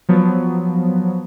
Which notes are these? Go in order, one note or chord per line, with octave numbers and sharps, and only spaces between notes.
F3 F#3 B3